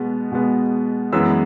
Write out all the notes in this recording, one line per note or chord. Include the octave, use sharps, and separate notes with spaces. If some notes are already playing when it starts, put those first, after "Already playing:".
Already playing: B2 G#3 B3
B2 G#3 B3
F#2 E3 G#3 B3 E6